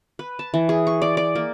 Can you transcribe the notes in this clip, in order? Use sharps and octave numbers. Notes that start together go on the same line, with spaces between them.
B4
A5
E3
G#4
C#6
D5
D5
A#3